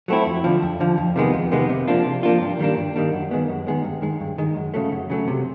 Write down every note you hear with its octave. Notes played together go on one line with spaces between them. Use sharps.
F#3 A3 C4 E4
F2
D3 F3
F2
D3 F3
F2
C3 D#3 G#3 B3
F2
C3 D#3 G#3 B3
C3
F3 A#3 D4 F4
C3
F3 A#3 D4 F4
G2
D#3 G3 A#3 D4
G2
D#3 G3 A#3 D4
F#2
D#3 G#3 B3
F#2
D#3 G#3 B3
G2
D#3 G#3
G2
D#3 G#3
F#2
C#3 F#3 A3
F#2
C#3 F#3 A3
C3